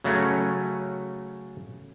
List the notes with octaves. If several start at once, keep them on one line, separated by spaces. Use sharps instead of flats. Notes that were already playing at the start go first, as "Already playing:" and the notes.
C#3 F#3 A3 C#4